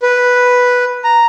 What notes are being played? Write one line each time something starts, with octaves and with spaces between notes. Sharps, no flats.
B4
A#5